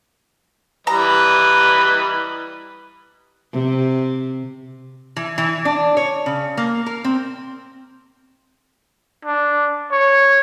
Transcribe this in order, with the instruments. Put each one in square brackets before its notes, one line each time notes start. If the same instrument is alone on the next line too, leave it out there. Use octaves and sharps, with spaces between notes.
[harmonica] E3 G3 D#5 [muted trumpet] B4 [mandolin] A#5
[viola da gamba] C3
[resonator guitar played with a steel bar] E3
E3
D4
C#5
C#3
A#3
A#4
C4
[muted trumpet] D4
C#5